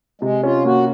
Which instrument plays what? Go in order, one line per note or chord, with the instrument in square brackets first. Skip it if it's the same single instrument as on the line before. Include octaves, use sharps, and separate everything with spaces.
[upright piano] C3 [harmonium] G#3
[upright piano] C#4 [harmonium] F4
[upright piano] A#3 [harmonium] F#4